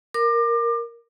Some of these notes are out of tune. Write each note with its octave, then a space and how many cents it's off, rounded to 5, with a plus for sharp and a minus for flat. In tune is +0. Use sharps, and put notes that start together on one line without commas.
A#4 +0 D6 +30